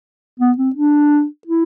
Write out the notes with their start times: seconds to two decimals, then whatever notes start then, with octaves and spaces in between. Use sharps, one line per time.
0.40 B3
0.58 C4
0.75 D4
1.47 E4